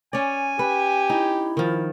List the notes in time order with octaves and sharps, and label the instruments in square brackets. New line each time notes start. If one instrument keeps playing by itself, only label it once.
[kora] C#4 D5 [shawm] G#5
[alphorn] G4 [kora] B4
[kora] D#4 [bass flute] E4
[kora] D#3 F3